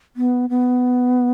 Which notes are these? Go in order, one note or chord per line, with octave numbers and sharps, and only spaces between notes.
B3
B3